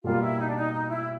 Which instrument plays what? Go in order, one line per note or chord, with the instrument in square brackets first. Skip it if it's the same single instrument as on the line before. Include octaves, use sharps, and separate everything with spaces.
[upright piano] B2 G3 A#3 [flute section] F4
[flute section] E4
D#4
D4
D#4
D#4
E4